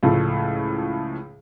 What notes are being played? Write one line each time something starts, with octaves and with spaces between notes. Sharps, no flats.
C#2 A2 F3 A3